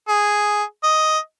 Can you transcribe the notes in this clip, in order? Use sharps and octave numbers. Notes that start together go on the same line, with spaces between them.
G#4
D#5